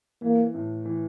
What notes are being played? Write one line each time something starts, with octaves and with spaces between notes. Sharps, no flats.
E3 A#3
A2
E3